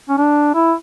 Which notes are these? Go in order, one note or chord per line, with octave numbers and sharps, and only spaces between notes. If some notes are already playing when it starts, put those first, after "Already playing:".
C#4
D4
E4